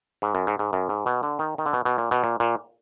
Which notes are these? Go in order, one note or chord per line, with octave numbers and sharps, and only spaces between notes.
G#2
F#2
G#2
G#2
F#2
G#2
B2
D3
D#3
D#3
D3
B2
B2
A#2
B2
A#2
A#2